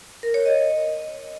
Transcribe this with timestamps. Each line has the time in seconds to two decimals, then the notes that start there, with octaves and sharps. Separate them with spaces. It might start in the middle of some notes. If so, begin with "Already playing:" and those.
0.23 A#4
0.34 C#5
0.45 D#5